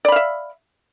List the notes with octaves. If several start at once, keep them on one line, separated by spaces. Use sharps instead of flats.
D5 E5 F5 B5